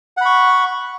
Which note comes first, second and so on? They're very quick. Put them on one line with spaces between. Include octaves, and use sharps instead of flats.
F#5 B5 C#6